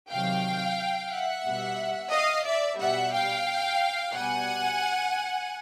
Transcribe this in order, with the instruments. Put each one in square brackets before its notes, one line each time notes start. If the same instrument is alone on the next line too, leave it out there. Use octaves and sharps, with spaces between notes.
[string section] C3 D#3 F#3 F5 G5
E5 F#5
B2 G3
D#5 F5
D5 E5
B2 G3 E5 F#5
F5 G5
B2 G3 F#5 G#5